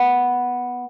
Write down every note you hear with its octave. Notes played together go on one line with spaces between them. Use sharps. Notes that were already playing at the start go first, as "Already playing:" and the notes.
Already playing: B3